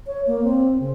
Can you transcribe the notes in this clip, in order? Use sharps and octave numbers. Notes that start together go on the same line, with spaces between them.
C#5
A#3
C4
C#3